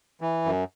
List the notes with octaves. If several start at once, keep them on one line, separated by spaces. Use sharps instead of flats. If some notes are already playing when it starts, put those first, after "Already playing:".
E3
F#2